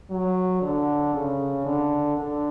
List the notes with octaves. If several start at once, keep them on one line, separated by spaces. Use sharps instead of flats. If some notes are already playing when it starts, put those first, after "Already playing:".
F#3
D3
C#3
D3
D3